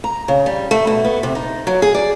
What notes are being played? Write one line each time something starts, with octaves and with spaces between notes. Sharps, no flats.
A#5
C#3
G3
A3
B2
B3
C3
D#4
F#3
G#4
D5